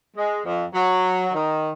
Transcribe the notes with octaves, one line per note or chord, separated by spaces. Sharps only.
G#3
F2
F#3
D#3